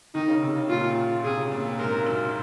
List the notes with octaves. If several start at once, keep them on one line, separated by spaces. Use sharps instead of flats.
D#3 D#4
C#3
C3
C#3
A#2 F4
C3 G#4
C#3
A#2
C3
G#2 A#4
G#2
F#2